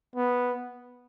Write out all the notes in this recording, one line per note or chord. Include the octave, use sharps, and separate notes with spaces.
B3